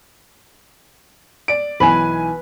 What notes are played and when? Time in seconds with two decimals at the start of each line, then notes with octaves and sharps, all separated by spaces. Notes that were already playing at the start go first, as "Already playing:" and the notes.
1.48 D5 D7
1.80 B1 E3 B4 G#5